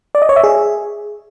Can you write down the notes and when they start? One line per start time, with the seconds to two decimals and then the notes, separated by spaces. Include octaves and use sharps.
0.15 D5
0.22 D#5
0.29 C#5
0.36 E5
0.44 G#4